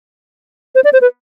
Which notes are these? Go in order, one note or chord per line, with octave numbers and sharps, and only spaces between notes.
C5
D5
C5
B4